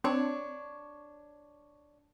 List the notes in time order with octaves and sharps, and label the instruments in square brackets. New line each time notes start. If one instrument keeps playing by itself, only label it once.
[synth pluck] C4 [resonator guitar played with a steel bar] D4 C#5